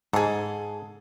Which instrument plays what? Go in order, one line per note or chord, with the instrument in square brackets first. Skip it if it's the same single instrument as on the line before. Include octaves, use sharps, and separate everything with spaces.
[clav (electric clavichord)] G#2 [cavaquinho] G#4 A4